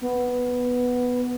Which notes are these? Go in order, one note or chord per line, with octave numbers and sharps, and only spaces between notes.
B3